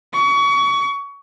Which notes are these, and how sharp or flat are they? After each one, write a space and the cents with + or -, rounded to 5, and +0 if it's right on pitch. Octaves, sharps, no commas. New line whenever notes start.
C#6 +30